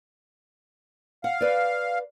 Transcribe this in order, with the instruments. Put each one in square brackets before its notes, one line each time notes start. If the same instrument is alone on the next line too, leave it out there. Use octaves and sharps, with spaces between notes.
[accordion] F5 [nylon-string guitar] F#5
[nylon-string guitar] B4 D5